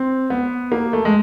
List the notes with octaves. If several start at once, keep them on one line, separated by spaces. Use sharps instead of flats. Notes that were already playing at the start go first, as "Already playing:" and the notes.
Already playing: C4
B3
A#3
A3
G#3